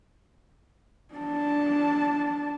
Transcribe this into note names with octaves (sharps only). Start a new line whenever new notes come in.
D4 A5